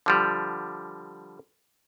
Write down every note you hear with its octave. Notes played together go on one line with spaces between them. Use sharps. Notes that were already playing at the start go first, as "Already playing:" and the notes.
D3 F3 G3